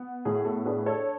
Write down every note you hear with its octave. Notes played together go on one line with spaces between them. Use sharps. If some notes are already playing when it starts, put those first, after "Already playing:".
Already playing: B3
A2 G#4
A4
D4 G#4 B4
A4 C#5